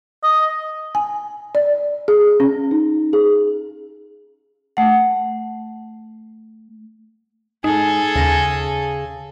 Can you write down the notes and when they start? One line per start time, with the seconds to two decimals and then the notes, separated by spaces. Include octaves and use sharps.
0.23 D#5
0.95 G#5
1.55 D5
2.08 G#4
2.40 C#4
2.71 D#4
3.13 G#4
4.77 A3 F#5
7.64 G#2 D#4 G#4 A4
8.16 D#2 C#3 A#6